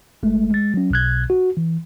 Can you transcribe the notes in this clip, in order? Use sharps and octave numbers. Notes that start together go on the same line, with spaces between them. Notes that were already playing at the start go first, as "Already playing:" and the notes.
G1 G#3 A3
G#3 A6
F#3 C#4
B1 B2 F#6 G#6
F#4
E3